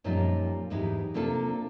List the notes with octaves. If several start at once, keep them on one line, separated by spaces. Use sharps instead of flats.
F#2 A#2 F3 G3 D#4 F4
E2 G#2 B3 D#4 E4 G4
C3 A#3 D4 F4 A4